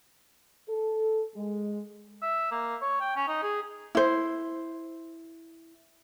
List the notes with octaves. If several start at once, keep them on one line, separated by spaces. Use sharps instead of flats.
A4
G#3
E5
A#3
C#5
G5
C#4
D#4
G#4
E4 C5